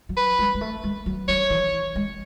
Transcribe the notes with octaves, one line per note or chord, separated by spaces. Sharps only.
F#3
B4
G#3
G#3
A3
G#3
F#3
F#3 C#5
E3
G#3